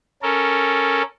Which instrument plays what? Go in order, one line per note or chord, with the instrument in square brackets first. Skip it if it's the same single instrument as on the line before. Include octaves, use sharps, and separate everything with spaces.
[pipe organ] C#4 A4 A#4